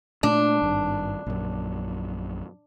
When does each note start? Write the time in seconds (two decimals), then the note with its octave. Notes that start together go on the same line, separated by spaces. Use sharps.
0.23 A#2 A3 A#3 D4
0.61 G#1 G2
1.26 A#1 F#2